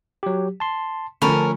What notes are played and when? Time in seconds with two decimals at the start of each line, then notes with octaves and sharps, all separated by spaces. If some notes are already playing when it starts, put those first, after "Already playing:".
0.23 F#3 G4
0.60 A5 C6
1.22 D3 F3 A3 C#4 A#4 A5 B5 C#6